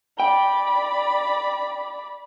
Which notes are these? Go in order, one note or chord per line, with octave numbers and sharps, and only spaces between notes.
D5 G5 B5